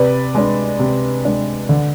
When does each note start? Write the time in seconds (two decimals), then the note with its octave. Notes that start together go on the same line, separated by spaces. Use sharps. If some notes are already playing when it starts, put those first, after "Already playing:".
Already playing: C3 B4 D5
0.35 G#3 D4
0.79 C3
1.25 G#3 D4
1.69 D3